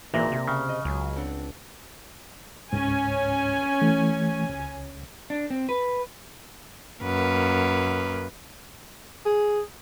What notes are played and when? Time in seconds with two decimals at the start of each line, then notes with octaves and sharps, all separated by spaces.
0.14 G#1 A#2 E3 A#3 A#4 D5 E5 A#6
0.32 C3
0.47 C#3 F6
0.69 D#5
0.85 C#2 F#3 G#4
1.16 C4 D4 F#5
2.73 C#2 G#2 C#4 G#5
3.81 E3 A3
4.50 C#2
5.30 D4
5.50 C4
5.69 B4
7.03 F#2 A#3 B4
9.26 G#4